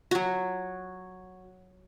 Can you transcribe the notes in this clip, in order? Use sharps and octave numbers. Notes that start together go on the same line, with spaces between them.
F#3 F#4